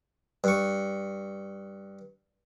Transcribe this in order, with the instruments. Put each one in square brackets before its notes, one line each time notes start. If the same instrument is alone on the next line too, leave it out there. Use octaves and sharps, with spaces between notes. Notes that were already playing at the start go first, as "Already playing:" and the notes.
[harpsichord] G2 C#6